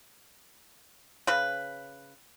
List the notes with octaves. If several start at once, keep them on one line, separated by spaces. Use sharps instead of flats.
C#3 B4